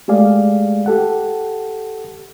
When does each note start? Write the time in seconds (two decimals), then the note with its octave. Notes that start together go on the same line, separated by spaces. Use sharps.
0.08 G#3 A3 G4 G#4 D5 F5
0.86 G4 A4 F#5